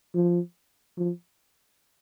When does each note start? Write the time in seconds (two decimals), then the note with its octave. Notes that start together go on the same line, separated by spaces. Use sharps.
0.14 F3
0.98 F3